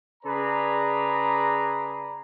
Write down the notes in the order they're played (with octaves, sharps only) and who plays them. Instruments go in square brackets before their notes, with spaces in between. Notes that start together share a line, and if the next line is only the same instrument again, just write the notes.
[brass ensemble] C#3 G#4 B4 D5 A#5